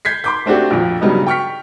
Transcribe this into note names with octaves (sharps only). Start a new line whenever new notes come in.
G6 G#6 B6 C7
C6 D6 G6
A3 C4 D4 F#4 G4
A#1 F2
G2 C#3 F#3 G3 B3 D#4
G5 C#6 F6 B6